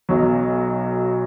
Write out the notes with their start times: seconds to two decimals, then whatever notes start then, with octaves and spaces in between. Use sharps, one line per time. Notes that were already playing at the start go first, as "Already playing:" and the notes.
0.09 B1 B2 F#3